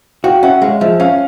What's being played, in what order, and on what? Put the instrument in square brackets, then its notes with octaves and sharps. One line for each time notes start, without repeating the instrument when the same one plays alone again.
[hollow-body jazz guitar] F#4 [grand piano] F5 G5
[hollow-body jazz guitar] C#4 [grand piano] E5 F#5
[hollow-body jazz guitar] G#3 [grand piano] F5
[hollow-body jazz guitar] F3 [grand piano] E5
[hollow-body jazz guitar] C#4 [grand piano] F5